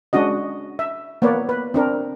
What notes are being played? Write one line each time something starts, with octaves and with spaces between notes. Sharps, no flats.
G#3 C#4 D4 F#4 D#5
E5
A#3 B3 B4 C#5 D5
B4
C4 D4 A#4